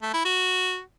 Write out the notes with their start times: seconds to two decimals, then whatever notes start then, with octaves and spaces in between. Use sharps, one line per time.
0.02 A3
0.14 E4
0.25 F#4